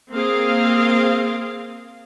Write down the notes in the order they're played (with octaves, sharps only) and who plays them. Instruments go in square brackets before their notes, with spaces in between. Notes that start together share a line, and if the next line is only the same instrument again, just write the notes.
[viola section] A#3 C4 G#4 F5